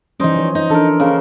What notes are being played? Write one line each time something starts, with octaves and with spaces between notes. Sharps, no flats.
E3 G3 C#4 D#4 C5 D#5
F3 C#5
D#4
E3 D4 A4 A#4
C#3 A#3